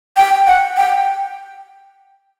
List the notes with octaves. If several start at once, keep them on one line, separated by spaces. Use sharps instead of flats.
G5
F#5
G5